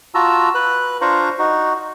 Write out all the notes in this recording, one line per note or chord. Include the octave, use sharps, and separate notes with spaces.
F4 F#4 A5 A#5 E6
B4 F#6
D4 F4 C5 F5 A#5 C#6
D#4 F#4